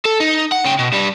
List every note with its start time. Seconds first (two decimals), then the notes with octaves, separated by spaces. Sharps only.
0.05 A4
0.20 D#4
0.52 F#5
0.64 C#3 G5
0.79 B2
0.93 G2 G3